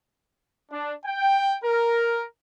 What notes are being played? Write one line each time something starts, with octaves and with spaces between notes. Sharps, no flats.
D4
G5
A#4